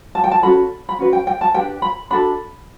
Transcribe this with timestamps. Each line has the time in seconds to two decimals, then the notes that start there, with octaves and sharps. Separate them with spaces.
0.15 A5
0.24 G5
0.31 A5
0.42 C#4 F#4 A4 B5
0.89 B5
0.99 C#4 F#4 B4
1.13 G5
1.27 G5
1.41 A5
1.54 D4 G4 B4 G5
1.82 B5
2.10 D4 F#4 A4 B5